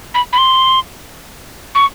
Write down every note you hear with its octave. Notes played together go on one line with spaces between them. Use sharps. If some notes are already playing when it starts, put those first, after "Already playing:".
B5
B5
C6
C#6